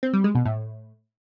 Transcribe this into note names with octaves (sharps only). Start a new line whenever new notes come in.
C4
G3
G#3
B2
A2